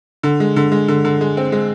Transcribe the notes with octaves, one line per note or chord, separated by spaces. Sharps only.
D3
G#3
D3
G#3
D3
D3
G#3
C4
G#3